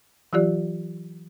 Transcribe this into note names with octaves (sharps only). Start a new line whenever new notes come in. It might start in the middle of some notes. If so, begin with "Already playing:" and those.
E3 F#3 F4 G4 D5